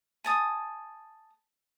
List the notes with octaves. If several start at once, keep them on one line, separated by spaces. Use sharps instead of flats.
G#5 A5 D#6